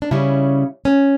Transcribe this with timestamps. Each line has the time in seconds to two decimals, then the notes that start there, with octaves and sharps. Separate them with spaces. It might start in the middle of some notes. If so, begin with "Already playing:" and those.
0.02 D4
0.11 C#3 G3 C#4 E4
0.85 C#4